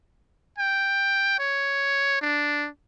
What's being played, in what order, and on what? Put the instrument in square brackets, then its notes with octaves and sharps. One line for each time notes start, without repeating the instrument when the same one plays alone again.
[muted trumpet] G5
C#5
D4